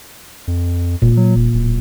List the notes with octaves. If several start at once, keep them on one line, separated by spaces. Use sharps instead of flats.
F2
E1 A#2
F#3
D#1
D1